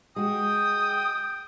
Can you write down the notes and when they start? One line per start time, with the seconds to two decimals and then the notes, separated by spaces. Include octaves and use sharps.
0.16 G#3 F#4 G5 D#6